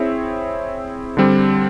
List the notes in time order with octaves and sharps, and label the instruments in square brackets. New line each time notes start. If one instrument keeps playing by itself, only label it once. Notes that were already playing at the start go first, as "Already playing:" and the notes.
Already playing: [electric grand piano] C4 E4 G#4 C#5 E5
D3 G3 C4